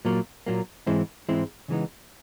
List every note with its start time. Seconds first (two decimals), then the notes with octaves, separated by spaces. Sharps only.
0.05 A#2 F#3 A#3
0.46 A#2 F#3 A#3
0.87 G#2 E3 G#3 C4 E4
1.29 G#2 E3 G#3 C4 E4
1.68 C#3 E3 G#3 B3 D#4